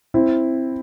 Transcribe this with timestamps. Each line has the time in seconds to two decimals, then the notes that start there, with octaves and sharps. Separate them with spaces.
0.14 C4 E4